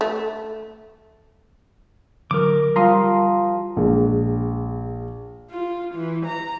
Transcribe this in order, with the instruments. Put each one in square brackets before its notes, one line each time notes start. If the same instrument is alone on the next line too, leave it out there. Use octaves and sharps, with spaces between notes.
[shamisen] A3
[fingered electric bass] D3 F#3 [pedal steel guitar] A#4 D6
[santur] F3 G4 [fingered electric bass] G3 [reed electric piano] A#5 C6 D#6
[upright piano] A#1 G#3
[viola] F4
E3
A#5